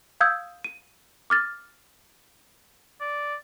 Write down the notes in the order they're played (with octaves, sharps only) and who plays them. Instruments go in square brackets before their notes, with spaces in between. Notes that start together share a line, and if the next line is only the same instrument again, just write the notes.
[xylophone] F5 D#6 E6 G6 G#6
D#7
D6 F6 A6
[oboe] D5